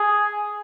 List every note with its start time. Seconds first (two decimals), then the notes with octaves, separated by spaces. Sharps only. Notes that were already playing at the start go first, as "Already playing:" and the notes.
Already playing: G#4